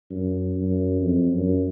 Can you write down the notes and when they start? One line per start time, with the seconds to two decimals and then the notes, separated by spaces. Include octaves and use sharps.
0.10 F#2
0.56 F#2
1.01 F2
1.32 F#2